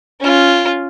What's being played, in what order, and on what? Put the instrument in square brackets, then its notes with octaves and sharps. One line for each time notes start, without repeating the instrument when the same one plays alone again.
[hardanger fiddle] C#4 F4